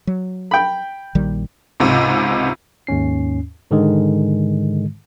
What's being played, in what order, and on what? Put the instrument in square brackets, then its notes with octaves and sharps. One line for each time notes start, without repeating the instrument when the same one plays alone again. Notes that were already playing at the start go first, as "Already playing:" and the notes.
[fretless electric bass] F#3
[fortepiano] G5 B5
[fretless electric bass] A#1 D#3 G3
[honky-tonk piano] C#2 G#2 C3
[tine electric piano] D#2 G#2 C#4 C7
G#2 D3 D#3 G#3